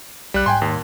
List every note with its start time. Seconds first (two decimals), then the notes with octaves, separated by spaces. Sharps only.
0.34 B1 G3 F#6
0.46 G#2 G5 G#5 C6
0.62 D#2